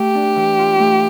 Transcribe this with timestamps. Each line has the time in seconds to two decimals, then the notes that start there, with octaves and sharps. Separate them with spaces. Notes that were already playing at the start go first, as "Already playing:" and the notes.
Already playing: A3 G4
0.15 D4
0.36 E3
0.59 F4
0.79 A3